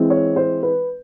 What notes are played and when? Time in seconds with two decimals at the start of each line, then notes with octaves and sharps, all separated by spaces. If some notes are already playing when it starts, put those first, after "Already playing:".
Already playing: E3 G#3 C4
0.10 C#5
0.36 C5
0.62 B4